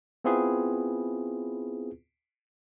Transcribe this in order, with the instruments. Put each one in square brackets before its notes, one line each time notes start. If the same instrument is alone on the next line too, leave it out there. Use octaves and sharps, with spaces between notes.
[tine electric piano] B3 C4 E4 F4 G#4 B4